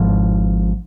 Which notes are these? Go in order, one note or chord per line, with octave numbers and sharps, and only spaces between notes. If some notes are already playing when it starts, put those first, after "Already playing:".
Already playing: G#1 G#2 F3